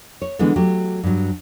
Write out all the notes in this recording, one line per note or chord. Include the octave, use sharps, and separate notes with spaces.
C#5
D3 E3 G#3 B3
F#3 A3 G4
G2 F#3